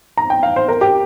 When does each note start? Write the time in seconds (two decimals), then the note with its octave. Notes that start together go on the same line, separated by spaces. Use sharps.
0.18 A#5
0.30 G5
0.43 F5
0.56 C5
0.68 A#4
0.81 G4